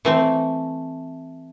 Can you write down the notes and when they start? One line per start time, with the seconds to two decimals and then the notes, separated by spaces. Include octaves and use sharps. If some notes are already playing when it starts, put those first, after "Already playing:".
0.05 E3 A3 C4